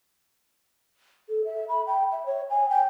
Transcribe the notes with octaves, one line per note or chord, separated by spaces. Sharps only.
A4
E5
B5
G5
E5
C#5
G#5
G5